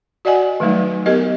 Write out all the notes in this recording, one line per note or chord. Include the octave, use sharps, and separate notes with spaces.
F#4 D5 D#5 F#5 G#5
D#3 F#3 G3 A3 D#4
B3 G4 A#4 D#5